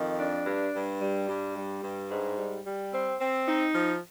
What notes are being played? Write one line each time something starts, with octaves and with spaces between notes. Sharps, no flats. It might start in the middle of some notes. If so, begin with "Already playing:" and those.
Already playing: F2 D#3
D4
G2
G2
G3
G2
G3
G2
G#2
G3
G3
C4
C4
D#4
F3